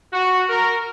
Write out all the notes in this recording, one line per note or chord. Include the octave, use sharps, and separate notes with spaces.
F#4
A#4